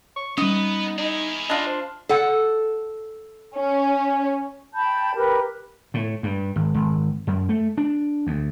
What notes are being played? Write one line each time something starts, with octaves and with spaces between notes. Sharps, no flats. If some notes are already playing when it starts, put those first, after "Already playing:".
C#6
G3 B3 C#4 D#4 B4 D#5
D#4 E4 G#4
D4 F4 D#5
C5
A4 F#5
C#4
G5 A5 B5 G6
G4 A#4 B4
A2
G2
G#1
G#1
F#2
A3
D4
D2